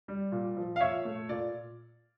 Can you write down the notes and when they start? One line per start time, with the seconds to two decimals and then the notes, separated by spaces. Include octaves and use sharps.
0.08 G3
0.32 A#2
0.57 F3
0.76 F5
0.80 A#2 C#5 E5
1.05 A3
1.29 A#2 D5